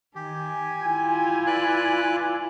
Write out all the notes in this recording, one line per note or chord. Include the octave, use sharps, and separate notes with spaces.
D#3 G4 G#5
E4 F4
B4 D5 F#6